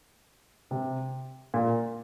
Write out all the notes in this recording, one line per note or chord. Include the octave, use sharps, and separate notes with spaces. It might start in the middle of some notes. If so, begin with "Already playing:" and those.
C3
A#2